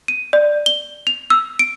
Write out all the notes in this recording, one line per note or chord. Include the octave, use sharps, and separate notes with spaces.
D#7
D5
G7
F7
E6
D7